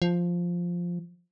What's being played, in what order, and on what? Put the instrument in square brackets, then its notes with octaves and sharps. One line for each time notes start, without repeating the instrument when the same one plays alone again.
[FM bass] F3